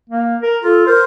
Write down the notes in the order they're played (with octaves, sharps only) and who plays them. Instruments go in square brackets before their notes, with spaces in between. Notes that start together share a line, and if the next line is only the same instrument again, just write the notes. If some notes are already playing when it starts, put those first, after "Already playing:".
[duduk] A#3
A#4
[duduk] F4 [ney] A4
[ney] A#4 [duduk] C5